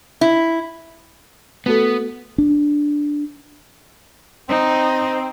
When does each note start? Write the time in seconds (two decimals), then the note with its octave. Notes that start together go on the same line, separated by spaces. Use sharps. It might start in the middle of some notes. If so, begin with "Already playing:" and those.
0.21 E4
1.66 A3 B3 F#4 A4
2.38 D4
4.49 C4 D#4